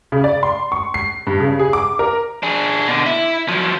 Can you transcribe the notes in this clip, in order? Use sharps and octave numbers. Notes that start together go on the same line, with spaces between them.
C#3
D5
C6
C#6
C7
G2
C#3
G#4
D6
A#4
D4 G#4
B2 D3
E4
F3 F#3